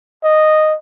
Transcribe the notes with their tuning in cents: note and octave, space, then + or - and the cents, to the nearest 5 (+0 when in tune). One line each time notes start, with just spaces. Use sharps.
D#5 -5